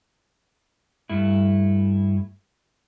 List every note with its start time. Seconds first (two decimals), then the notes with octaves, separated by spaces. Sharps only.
1.10 G2 A3 E4